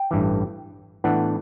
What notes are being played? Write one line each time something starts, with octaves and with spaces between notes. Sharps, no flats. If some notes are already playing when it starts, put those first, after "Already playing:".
Already playing: G5
A1 G2 E3
A2 E3 B3 D4 F#5